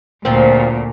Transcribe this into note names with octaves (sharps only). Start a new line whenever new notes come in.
D2 A#2 F3 C4